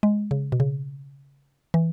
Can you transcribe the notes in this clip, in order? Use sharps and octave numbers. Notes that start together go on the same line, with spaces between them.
G#3
C#3
B2
C#3
E3